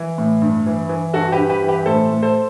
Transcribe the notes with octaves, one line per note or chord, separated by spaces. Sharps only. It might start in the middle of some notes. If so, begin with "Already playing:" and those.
Already playing: E3
A2
G2
E3
E3
G2 F#4 A4
G4 B4
G2
G4 B4
E3
G4 B4
A2 A4 C5
A2
A4 C5